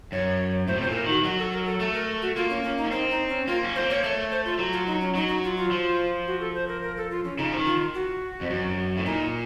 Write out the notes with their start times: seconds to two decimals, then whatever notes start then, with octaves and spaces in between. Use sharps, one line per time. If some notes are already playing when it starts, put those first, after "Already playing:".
0.12 F#2 C#5
0.68 A2 C5
0.78 C3
0.82 C5
0.87 A#2 A4
0.96 A#4
1.05 D#3 F#4
1.24 F#3 F#4
1.39 A4
1.52 A#4
1.66 A4
1.80 A3 A4
1.94 A#4
2.22 F#4
2.36 A#3 F4
2.50 C#4
2.63 C#4
2.78 D#4
2.85 C#4
2.91 C4 D#4
3.10 D#4
3.29 C#4
3.47 A#3 F4
3.63 C#4
3.76 C4 C5
3.90 A#3 C#5
4.03 A3 C#5
4.32 C5
4.45 F4
4.59 F#3
4.73 F4
4.87 D#4
5.01 C#4
5.15 F#3 D#4
5.28 D#4
5.43 F4
5.57 F4
5.71 F3
6.27 F#4
6.40 A4
6.55 C5
6.68 A#4
6.83 A#4
6.97 A4
7.10 F4
7.24 C#4
7.38 C#3 D#4
7.52 F3
7.57 D#3
7.66 F4
7.94 F#4
8.41 F2
8.50 F#2
8.97 A2
9.05 A#2 D#4